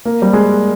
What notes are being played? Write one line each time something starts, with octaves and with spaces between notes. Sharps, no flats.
A#3
G3
G#3